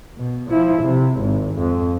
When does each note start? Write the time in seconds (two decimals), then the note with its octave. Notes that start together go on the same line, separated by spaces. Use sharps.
0.18 B2
0.50 F3 E4
0.83 C3
1.19 G#1
1.59 F2